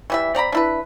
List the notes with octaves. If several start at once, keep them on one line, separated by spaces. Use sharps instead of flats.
E3 G3 E5
C4 D5 A#5 B5
D4 E4 B4